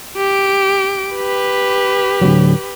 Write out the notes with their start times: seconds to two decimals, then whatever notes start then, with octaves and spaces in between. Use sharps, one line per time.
0.17 G4 D7
1.15 G4 B4
2.21 D1 D2 F#3